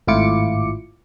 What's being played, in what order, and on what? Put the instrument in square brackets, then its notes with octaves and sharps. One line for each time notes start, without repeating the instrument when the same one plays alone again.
[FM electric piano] G#1 A2 E4 F4 D6 C#7